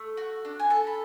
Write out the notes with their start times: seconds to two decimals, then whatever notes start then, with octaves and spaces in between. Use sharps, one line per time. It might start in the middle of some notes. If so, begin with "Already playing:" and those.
Already playing: A3
0.17 F#4
0.45 D4
0.59 G#5
0.70 A4 A5
0.87 B5